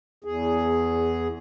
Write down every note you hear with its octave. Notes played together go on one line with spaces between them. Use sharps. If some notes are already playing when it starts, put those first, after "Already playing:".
E2 G#4